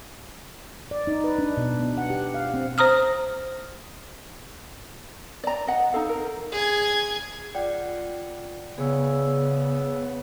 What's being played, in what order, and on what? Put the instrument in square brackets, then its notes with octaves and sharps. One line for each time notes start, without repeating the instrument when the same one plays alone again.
[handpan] D5
D#4
B4
D4
B2
B3
F#5
G4
F5
C4
[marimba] C5 A#5 D#6 F6
[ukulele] D5 A#5
D#5 F#5
D#4 F4 A4 F5
A#4
[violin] G#4 G#6
[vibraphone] F4 [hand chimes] D5 F#5 G5
[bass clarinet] C#3 [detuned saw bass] B3 [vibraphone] G#4 C#5 E6